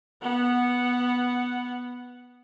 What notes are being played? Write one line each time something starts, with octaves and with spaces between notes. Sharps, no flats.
B3 F#5